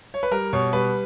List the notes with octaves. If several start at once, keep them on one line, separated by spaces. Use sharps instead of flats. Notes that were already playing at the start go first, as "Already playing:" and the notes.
C#5
B4
G3 A#4
B2 C#5
G3 B4